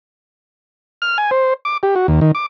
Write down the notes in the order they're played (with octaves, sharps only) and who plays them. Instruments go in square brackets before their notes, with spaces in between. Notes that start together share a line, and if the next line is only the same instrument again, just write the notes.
[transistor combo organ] F6
G#5
C5
D6
G4
F#4
D#2
D#3
D6